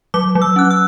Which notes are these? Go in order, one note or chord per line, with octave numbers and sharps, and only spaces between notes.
F#3 D6
F#3
E6
C#4 F#6
E6